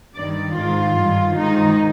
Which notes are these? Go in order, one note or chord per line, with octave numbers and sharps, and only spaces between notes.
G2 D#3 D5
G#2 D#3 F4
G2 D#3
G#2 D#3 D#4